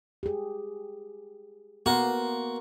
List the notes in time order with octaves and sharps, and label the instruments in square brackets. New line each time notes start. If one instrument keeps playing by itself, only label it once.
[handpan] G4 G#4
[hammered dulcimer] A#3 C6 [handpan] B3 [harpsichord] F#4